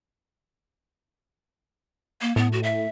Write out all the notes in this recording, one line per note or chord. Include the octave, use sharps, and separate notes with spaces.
A#3
A2 B3
F#4
E5